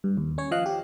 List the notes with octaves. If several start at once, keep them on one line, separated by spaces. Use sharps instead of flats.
G2
D#2
C#4 C#5
F3 D#5 F5 F#6
G4